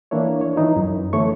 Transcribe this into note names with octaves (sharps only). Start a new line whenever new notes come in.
E3 A#3 D4 E4 C#5
C#5
E3 D#4 E4
F#2
D3 E3 A3 C#5 C#6